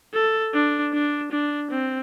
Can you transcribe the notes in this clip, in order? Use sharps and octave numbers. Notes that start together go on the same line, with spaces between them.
A4
D4
D4
D4
C4